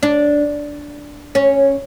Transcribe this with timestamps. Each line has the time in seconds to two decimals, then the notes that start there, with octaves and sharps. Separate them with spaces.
0.03 D4
1.35 C#4